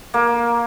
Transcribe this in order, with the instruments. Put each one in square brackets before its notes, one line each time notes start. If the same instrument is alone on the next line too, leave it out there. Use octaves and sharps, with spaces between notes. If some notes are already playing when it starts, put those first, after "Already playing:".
[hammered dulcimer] A#3